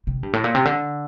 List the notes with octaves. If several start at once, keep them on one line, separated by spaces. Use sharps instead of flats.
C3
G2
A2
A#2
C3
D3